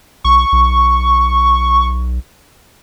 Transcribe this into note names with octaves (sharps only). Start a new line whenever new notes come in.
B1 C#6
B1